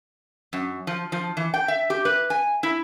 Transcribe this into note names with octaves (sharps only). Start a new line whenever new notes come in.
F#2
F3
F3
E3
G5
E5
G4
B4
G#5
E4